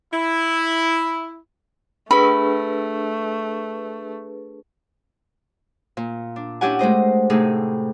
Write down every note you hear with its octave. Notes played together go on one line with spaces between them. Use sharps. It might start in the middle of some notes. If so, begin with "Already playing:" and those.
E4
A3 D4 G#4 B4 B5
A#2
D4
C#4 D4 E4 G4 F#5 G#5
G#3 A3 C5 D#5
A2 C3 A3 D#4 G#4